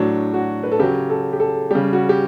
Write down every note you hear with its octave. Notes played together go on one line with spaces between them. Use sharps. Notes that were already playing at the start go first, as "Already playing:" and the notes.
Already playing: A2 F#3 D4
F#4
B4
A4
C#3 F#3 G4
A4
G4
A4
C#3 G3 G4
F#4
G4